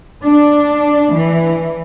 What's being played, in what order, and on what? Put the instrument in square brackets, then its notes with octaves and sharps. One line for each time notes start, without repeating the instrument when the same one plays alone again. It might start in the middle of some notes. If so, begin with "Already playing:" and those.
[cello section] D4
E3